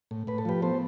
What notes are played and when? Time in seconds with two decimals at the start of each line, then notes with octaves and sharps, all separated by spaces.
0.11 A2
0.27 A2 B4
0.38 A4
0.45 F3 G4 B4
0.62 B3 A4 C5